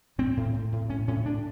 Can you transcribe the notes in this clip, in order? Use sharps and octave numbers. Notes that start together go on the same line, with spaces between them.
A2 C4
A2
A2
A2
A2 C#4
A2 C#4
A2 D4